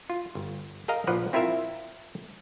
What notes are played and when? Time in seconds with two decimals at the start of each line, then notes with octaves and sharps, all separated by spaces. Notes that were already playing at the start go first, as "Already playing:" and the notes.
0.10 F4
0.35 G1
0.88 G#4 A#4 D#5 F5 A#5
1.07 A#1 F3 B4 C5 D5 F#5
1.33 C4 E4 F4 A#4 E5